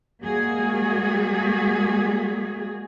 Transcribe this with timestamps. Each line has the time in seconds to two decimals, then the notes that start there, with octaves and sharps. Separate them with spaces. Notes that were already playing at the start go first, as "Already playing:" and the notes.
0.22 G3 G#3 A#3 F#4 G#4